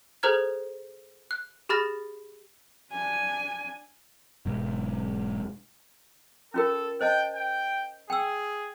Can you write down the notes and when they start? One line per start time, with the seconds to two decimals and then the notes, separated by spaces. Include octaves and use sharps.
0.23 G#4 A4 C5 A#5 F6 G#6
1.31 F#6
1.69 G4 G#4 B5 F6 A6 A#6
2.92 D4 G#5
4.46 E1 G#2
6.54 C#4 F4 A4 A#4
7.01 C5 D#5 G5 A5
7.35 G5
8.10 G#4 G5 E6